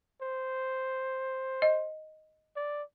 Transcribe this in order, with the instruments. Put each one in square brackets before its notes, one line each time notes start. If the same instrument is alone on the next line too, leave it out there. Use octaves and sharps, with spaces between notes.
[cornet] C5
[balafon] D#5
[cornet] D5